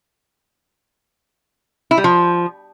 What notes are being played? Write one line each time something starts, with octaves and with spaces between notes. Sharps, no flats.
E4
G3
F3